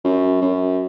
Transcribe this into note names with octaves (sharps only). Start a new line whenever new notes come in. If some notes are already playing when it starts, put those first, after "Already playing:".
F#2
F#2